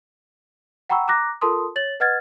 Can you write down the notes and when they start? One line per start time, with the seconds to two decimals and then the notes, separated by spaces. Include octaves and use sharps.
0.90 F#5 G5 A#5 B5 C#6 E6
1.08 A#5 D6 F#6 A#6
1.41 F4 A4 A#4 A5 C6 D#6
1.76 C#5 A6 F#7
2.00 B4 D#5 F#5 F6 G#6 A6